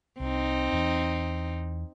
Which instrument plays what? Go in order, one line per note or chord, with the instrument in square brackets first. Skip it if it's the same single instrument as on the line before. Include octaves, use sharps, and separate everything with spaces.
[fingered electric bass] C2 [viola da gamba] C4 D#4
[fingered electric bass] E2 E3